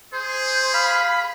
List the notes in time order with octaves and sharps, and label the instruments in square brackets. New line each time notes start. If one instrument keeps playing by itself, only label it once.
[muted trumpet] G#4 [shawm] C5
[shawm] F5 [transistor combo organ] B5